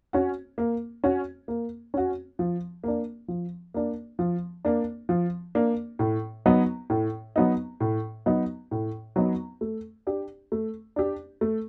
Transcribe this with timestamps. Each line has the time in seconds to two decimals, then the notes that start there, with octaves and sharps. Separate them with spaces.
0.13 C#4 F#4
0.58 A#3
1.04 C#4 F#4
1.48 A#3
1.94 C#4 F#4
2.39 F3
2.84 A#3 D4
3.28 F3
3.74 A#3 D4
4.19 F3
4.65 A#3 D4
5.09 F3
5.55 A#3 D4
5.99 A2
6.46 F#3 B3 D#4
6.90 A2
7.36 F#3 B3 D#4
7.80 A2
8.26 F#3 B3 D#4
8.71 A2
9.16 F#3 B3 D#4
9.61 A3
10.07 D4 G4
10.52 A3
10.96 D4 G4
11.41 A3